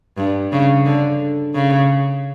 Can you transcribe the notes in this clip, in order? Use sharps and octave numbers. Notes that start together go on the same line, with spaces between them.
G2
C#3
D3
C#3